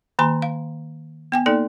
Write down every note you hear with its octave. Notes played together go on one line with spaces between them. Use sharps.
D#3 A#3 G#5 A#5 C6
F5
B3 G5 G#5
A#3 D#4 A4 D5